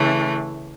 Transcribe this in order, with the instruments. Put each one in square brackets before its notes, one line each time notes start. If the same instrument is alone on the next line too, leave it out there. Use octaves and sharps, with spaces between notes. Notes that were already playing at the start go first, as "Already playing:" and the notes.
Already playing: [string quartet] C#3 E3 A3